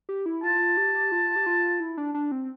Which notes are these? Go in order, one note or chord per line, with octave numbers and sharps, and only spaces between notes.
G4
E4
F4 A5
G4
F4
G4
F4
E4
D4
D4
C4